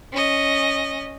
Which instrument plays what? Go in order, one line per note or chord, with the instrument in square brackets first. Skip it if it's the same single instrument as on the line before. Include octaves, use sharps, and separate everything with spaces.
[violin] C#4 D#5